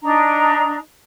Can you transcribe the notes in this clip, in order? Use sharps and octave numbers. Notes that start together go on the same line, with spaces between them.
D4 D#4 A#5